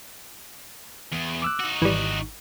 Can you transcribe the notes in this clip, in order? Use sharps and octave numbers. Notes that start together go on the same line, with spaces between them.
E2
D6 E6 F#6
D#4 F#4
G#1 E3 G3